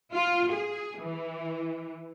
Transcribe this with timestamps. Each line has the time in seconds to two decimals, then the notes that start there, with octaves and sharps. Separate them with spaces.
0.13 F4
0.52 G#4
1.00 E3